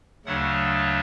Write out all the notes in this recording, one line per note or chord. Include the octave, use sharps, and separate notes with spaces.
D2 C#3 F#3 A3 D4 F#5